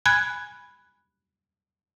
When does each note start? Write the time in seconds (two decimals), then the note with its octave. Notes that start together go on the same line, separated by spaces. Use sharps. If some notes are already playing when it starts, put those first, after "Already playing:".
0.06 G#5 B5 F#6 G#6